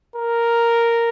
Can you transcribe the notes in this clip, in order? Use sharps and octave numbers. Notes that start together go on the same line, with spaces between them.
A#4